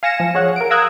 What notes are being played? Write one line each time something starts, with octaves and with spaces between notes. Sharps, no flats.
F5 G#5 A#6 C#7 E7
F3
G#4 C#5 F#5
A#4 D7
F5 A#5 D#6 E6 F#6 G#6